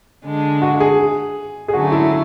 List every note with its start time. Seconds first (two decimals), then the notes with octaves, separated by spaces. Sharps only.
0.24 D3 G#3 D4
0.62 F#4
0.80 G#4
1.68 G#4
1.73 D3 F#3 A3 C#4 F#4
1.92 E4